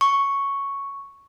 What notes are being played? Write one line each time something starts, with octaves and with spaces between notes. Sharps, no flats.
C#6